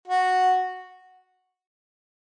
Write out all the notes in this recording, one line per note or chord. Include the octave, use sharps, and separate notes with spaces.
F#4